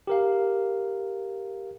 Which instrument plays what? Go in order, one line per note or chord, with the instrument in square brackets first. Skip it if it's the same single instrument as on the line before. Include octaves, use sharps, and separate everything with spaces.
[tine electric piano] G4 A#4 F5